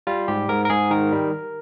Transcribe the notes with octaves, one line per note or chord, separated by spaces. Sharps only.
G3 F4
G#2 G4
G#2 A#4
A#4
G#2 G#4
D#3 A#4
G3